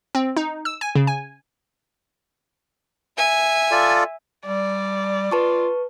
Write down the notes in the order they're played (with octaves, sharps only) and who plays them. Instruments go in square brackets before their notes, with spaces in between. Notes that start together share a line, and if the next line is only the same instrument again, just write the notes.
[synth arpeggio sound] C4
D#4
E6
G#5
C#3
G#5
[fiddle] E5 G#5
[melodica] F4 A4 D5
[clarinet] G3 [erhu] D5
[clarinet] F4 [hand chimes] B4 A5 C#6